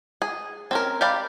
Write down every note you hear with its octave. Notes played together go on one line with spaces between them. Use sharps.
G#4
C4 C#4 A#4
G4 A#4 D5 F5 B5